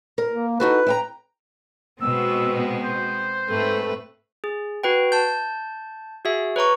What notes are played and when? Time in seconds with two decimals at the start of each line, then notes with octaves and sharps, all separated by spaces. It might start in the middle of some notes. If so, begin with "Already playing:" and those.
0.18 A#4
0.30 A#3
0.60 D#4 F#4 A4 B4
0.87 E4 G5 A#5
2.02 B2 G#3 B3 C4 E6
2.83 C5
3.49 G#2 A3 C4 B4
4.44 G#4
4.83 F#4 B4 G5
5.12 A5 G6
6.25 F#4 G#4 E5
6.56 B4 C#5 A#5 C#6